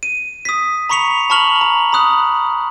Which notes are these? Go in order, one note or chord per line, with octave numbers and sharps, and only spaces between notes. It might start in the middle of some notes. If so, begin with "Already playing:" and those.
D#7
D#6 B6
A#5 B5 C#6 B6 C#7 F7
A5 B5 C#6 F6 F7 F#7
A#5
A#5 B5 D#6 F#6